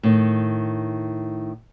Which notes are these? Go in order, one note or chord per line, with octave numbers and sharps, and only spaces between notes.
A2 D#3